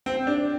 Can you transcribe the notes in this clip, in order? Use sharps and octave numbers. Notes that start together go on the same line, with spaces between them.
C4
D4